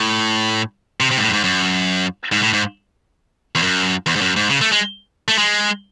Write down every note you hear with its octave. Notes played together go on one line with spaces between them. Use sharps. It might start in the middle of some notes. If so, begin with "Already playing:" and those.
Already playing: A2
C3
C3
G#2
A2
F#2
G#2
F#2
G#2
A2
G#2
E2
F#2
E2
G#2
F#2
G#2
C#3
A3
G#3
A3
G#3